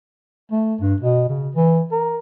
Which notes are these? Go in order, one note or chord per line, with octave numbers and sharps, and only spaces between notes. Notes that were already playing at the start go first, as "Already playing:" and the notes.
A3
G2
B2
C#3
E3
A#4